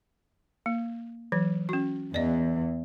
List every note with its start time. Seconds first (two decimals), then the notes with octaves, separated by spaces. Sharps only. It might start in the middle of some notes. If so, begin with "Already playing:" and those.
0.66 A#3
1.32 E3 F#3
1.69 C#4 F#4
2.14 E2 D5 D#5